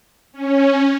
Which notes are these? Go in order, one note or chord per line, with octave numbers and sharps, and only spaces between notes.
C#4